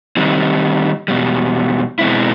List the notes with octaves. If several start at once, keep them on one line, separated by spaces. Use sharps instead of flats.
D#3 G3 C4 D#4
E2 B2 G3
B2 G#3 C4 E4